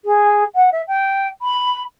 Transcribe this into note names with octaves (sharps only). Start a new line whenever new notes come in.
G#4
F#5
E5
G5
B5